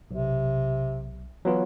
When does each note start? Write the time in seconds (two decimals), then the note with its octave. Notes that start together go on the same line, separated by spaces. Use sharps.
0.11 B1 C3
1.45 E3 F#3 B3 F4